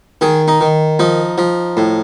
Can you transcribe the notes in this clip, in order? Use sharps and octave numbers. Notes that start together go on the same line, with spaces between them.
D#3 G#4
D#4
D#3
F3 D#4
F3
A2